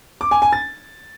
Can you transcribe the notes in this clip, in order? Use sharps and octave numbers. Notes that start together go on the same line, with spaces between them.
D6
G#5
G#5
A6